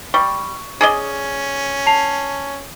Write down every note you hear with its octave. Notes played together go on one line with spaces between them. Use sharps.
G3 C#6
C#4 G#4 D5 D#5
A5 C7 F7